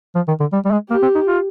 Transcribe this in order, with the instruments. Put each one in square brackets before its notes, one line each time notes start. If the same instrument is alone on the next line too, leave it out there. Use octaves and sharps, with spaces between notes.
[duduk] F3
D#3
D3
G3
G3
G#3
[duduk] A#3 [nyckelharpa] G4
[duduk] C4
D#4
F4